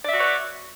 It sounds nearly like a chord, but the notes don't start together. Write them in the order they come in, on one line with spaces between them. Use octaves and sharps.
D5 E5 F#4 C#5 B4